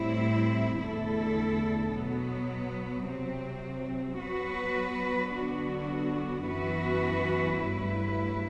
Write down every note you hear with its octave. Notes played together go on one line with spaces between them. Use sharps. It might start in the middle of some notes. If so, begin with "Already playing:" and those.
Already playing: A2 G3 C4 E4
E2 D3 A3 E4 A4
B2 F#3 B3
C3 F#3 C4
F#3 B3 F#4 B4
D3 F#3 B3 D4 F#4
F#2 E3 B3 F#4 B4
G2 F#3 A3 E4 B4